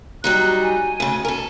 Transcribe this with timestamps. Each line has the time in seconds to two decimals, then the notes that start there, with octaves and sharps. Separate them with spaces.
0.24 F#3 G3 D#4 F#6
0.62 G#5
1.00 D2 C#3
1.25 A4 A#4